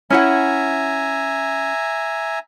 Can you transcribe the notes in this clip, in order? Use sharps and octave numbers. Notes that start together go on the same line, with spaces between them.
C#4 E4 E5 F#5 G#5 A#5